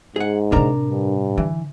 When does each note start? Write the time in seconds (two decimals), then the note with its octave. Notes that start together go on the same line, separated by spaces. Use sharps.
0.16 G#2 G#4 F#5
0.52 A2 C3 D4 A#4 A#5
0.90 G2
1.38 D3 E3